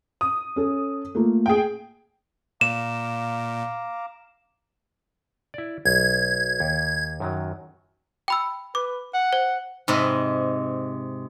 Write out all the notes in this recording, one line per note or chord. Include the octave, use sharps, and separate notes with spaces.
D#6
C#4 A4
A3 A#3 F4
G#4 G5
A#2 F5 A#5 D6 E7
E4 D5
B1 G#6
D#2
F#2 D#3 F#3
G5 B5 E6
B4 D6
F#5
C5
G#2 C3 D#5 B5